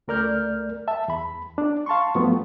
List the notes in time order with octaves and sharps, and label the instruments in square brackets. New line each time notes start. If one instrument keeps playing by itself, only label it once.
[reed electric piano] C#2 A3 A#4 D5 F6 G6
E5 A5
E2 B5
D4
F5 A5 C6 C#6
G2 F3 F#3 A3 B3 C4